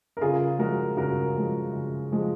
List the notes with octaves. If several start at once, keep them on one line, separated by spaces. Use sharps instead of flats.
A#4
C#3 F4 G#4
F3 G#3 F#4 A#4
C#3 F#4 A#4
F3 G#3
C#3
F3 G#3